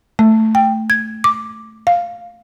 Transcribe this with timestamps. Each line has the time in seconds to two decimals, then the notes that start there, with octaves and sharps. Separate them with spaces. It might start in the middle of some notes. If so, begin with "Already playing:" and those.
0.19 A3
0.55 G5
0.90 G#6
1.24 D6
1.87 F5